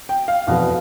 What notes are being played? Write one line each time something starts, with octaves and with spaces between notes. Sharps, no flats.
G5
F5
F1 E2 B2 B3 F5